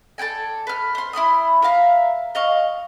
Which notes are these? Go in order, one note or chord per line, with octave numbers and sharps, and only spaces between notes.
A4 D5 G5 G#5
B4 F6
C5 C6
E4 B5 C6 D#6
A#4 E5 F5 A#5
D#5 F5 C#6